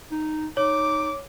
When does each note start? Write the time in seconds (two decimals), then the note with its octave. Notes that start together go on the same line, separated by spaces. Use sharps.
0.11 D#4
0.57 D#4 C#5 D6